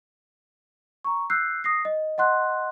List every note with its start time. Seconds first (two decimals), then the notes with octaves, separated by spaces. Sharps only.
1.04 A#5 C#6
1.30 E6 F#6 G6 C7
1.64 D#6 A#6 C7
1.85 D#5
2.18 D#5 F#5 C6 F#6